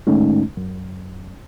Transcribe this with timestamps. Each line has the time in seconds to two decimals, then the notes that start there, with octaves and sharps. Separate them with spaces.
0.07 A2 D#3 G#3 A3 C#4 D#4
0.57 F#2